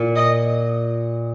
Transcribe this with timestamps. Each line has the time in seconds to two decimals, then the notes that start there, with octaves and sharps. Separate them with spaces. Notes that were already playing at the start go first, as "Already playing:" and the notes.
Already playing: A#2
0.16 D#5